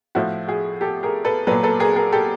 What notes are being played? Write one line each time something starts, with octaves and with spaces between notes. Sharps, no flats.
A2 F3 E4 F#4
F#4 G#4
G4 A4
G#4 A#4
A4 B4
A#2 F#3 A4 B4
A4 B4
G#4 A#4
G#4 A#4
G4 A4